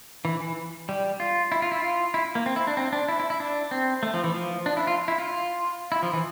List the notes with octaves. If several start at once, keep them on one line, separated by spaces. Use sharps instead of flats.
E3
E3
G3
F4
E4
F4
E4
F4
E4
A#3
C4
E4
D4
C4
D4
E4
E4
E4
D4
C4
A3
F3
E3
F3
D4
E4
F4
E4
F4
E4
F3
E3